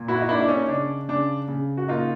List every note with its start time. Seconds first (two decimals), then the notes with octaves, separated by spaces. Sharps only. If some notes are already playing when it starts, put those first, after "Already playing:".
Already playing: A#2
0.08 E4 F#4
0.21 D#4
0.28 A#3 D4 E4
0.39 D4
0.48 C#4 D#4
0.68 C#3 D4
1.09 C#3 D4
1.48 C#3
1.77 F#4
1.88 A#3 D#4 F4